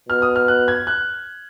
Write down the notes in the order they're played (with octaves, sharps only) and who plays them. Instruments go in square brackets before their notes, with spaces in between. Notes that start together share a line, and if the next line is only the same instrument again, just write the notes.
[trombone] B2 [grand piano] F6
[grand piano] D#6
F6
F#6
G#6
F#6